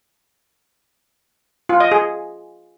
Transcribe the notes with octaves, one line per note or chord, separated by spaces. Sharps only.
F4
D#5
G#4